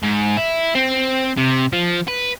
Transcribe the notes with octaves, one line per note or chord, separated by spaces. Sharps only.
G#2
E4
C4
C3
F3
B4